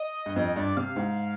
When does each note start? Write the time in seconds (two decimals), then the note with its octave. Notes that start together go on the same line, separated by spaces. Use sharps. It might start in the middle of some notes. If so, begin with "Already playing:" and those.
Already playing: D#5
0.26 G2
0.36 F2 D#5
0.56 G2 D5
0.77 C3 F5
0.96 G#2